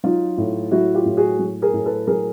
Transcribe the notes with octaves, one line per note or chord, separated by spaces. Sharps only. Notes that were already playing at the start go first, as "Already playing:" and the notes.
F#3 D#4 F4
A2
F#3 E4 F#4
F4 G4
A2
F#4 G#4
F#3
G#4 A#4
A2
A4 B4
F#3 G#4 A#4